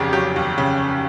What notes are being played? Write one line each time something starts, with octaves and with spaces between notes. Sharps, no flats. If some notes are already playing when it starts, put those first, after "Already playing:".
Already playing: F1 D#2 C#3 F#3 G4 G#4
F#3 G4
D#2
C#3